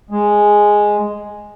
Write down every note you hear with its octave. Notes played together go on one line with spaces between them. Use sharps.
G#3